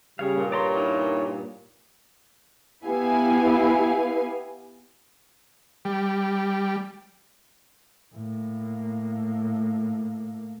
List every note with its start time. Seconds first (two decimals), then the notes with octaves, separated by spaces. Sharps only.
0.19 C#3 G3 G#4 C#5 F5
0.35 G2 A#2
0.52 C#5 D5 A#5 C6
0.77 D#4 E4 A#4
2.85 B3 E4 G4 B4 F5 G#5
5.85 G3
8.15 A2 A#3